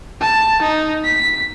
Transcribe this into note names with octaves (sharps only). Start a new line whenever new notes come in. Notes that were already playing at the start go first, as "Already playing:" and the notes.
A5
D#4
B6